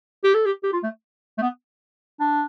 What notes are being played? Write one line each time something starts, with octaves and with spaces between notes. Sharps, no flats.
G4
A4
G4
G4
F4
A3
A3
B3
D4